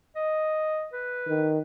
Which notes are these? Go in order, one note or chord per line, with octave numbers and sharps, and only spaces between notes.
D#5
B4
D#3